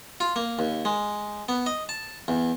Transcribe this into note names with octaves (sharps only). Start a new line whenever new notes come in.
F4
A#3
D#2
G#3
B3
D#5
A5
E2